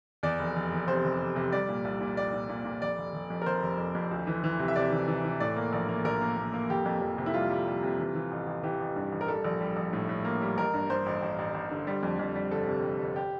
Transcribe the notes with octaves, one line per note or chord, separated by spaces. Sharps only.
E2 D5
F1
F1
E2
C3 C5
F1
F1
C3
G3 D5
A#2
C2
A#2
G3 D5
A#2
A#2
A#2
F1 D5
F1
F1
F2
A#4
F1 C5
F1
F2
F2
D2
E3
E3
C3
E5
C3 D5
E3
E3
E3
A2 D5
A#3
A#1
A#3
A#1 A#4
A#3
A#3
A#3
F1 G4
F2
F2
C3
E4
G3 F4
G3
G3
C3
E3
E3
A1
A1
E3 G4
A1
G2
A1
A#4
G3 A4
A#1
G3
A#1
A2
A2
A#3
G3
A1 A#4
G2
G2 C5
A1
A1
A1
A1
D3
G3
F2
F2
G3
G1 A4
C3
G3
G1
G4